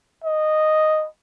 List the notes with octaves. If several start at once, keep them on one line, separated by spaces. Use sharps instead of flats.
D#5